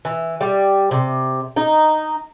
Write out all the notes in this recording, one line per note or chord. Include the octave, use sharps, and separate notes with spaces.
E3
G3
C3
D#4